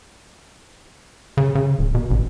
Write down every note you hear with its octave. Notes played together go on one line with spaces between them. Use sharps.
C#3
C#3
D1
B2
A1